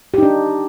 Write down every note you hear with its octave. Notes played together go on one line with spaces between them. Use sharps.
D4 D#4 G4